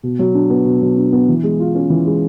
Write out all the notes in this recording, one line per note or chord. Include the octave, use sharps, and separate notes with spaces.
B2
F#3
D4
B3
B2
F#3
D4
B3
E3
G#3
F4
C#4
E3
G#3